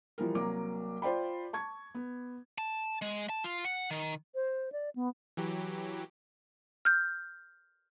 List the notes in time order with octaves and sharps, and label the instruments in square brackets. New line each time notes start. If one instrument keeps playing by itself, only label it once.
[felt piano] E3 F3 G3 A#4
C2 F#3 A#3 D6
F4 C5 D5 G5 B5
A5 C#6 G#6
B3
[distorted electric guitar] A5
G#3
A5
F4
F#5
D#3
[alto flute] C5
D5
B3
[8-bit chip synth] E3 F#3 G4
[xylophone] F6 G6